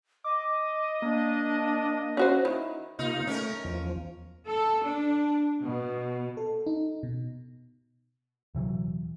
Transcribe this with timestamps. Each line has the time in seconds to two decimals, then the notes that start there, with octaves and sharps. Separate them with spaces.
0.24 D#5 D6
1.02 A#3 D4
2.17 C#4 F#4 C5
2.45 D#3 E4
2.99 C3 A#3 D#4 F4
3.27 A3 C#4 A#4
3.64 E2 F3
4.46 A4
4.83 D4
5.64 B2
6.37 A4
6.66 D#4
7.03 B2
8.55 D#1 C3 E3 F#3